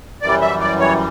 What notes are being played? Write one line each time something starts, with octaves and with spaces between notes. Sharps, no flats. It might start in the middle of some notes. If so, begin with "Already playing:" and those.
F#2 E3 G3 D5
E5
D5
C#5